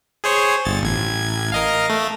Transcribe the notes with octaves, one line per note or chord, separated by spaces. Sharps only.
G#4 C5 C#5
G1 A6
A1 G#6
A#4 D#5 F5
A3